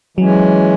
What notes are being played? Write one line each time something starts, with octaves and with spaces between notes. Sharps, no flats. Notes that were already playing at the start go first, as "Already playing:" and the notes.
E3 F#3 G#3 C#4